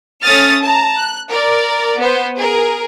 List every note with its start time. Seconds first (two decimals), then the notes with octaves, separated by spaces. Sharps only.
0.23 A3 C#4 D#6 F6 A6
0.62 A5 A#5
0.97 F#6
1.29 A#4 D5
1.97 B3 C5
2.37 G#4 A#4